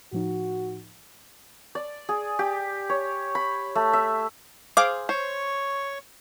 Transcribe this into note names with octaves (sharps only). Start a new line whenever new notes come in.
A2 F3 D#4 F#4
D5
G#4
G4
C#5
B5
A3
E5
G#4 C5 F5 D6
C5 C#5 C#6